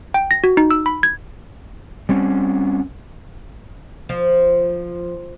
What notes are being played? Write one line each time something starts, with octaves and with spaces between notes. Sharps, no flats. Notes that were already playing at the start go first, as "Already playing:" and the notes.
G5
A#6
F#4
D#4
E6
B5
G#6
G3 C4 C#4
F3